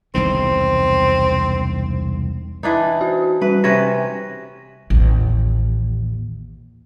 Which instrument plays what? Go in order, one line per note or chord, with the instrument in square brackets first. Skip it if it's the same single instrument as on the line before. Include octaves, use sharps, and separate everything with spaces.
[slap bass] E1 C2 D#3 [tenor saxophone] C4
[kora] E3 D4 D#4
[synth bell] F#4
[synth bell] G3 [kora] B4
[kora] C3 C#4 B4 [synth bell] A#6
[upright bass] A1 D#2